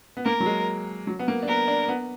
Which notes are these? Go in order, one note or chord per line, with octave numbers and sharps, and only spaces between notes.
B3
A#3 A#4
F#3
G#3
F#3
B3
A#3
D4
B3 A#4
D4
B3